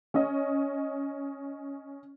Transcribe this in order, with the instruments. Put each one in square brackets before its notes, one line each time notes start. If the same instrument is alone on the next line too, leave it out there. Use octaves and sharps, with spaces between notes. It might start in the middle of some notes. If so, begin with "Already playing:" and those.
[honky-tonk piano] C#4 D#5